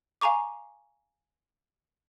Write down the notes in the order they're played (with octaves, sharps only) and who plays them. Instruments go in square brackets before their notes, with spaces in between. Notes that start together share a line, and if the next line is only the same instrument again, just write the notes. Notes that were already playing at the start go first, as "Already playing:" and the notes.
[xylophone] F5 G#5 A#5 C#6 D6